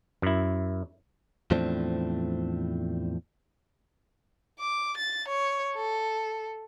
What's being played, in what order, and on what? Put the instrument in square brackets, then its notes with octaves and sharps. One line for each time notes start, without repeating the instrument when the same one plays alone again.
[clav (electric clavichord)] F#2 E4
[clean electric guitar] E2 A2 F3 A3 C4 D4
[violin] D6
A6
C#5
A4